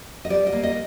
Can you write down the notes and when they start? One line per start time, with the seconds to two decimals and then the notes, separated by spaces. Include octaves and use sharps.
0.25 D#5
0.30 G3 D5
0.47 D#5
0.52 A#3
0.63 D#5